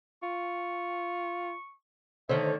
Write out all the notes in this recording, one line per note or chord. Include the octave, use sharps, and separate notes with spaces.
F4 C#6
D3 D#3 A3 C5 C#5 E5